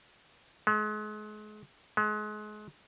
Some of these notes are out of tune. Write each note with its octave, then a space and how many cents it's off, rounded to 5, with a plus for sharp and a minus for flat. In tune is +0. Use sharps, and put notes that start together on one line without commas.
G#3 +35
G#3 +30